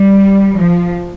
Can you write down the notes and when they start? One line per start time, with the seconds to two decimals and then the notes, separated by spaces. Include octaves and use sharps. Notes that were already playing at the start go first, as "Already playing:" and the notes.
Already playing: G3
0.57 F3